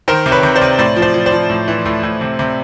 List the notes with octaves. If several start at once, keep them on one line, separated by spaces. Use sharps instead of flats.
D#3 A#4 C5
C3
B4 C#5
C3
C5 D5
C3
A2 C5 D5
F3
C5 D5
F3
C5 D5
F3
A2
E3
A2
A2
C3
C3